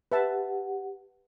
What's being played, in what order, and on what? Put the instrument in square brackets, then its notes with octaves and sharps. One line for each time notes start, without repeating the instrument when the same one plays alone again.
[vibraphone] G4 F#5 [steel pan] B4 E5 A5